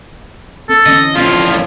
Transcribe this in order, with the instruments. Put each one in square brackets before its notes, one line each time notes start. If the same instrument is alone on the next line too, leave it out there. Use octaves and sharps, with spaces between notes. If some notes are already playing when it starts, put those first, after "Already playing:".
[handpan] C4 [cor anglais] A4
[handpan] D3 E3 C#4 [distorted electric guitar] D#5
[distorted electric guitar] A2 F3 [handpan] C4 D4 [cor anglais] F4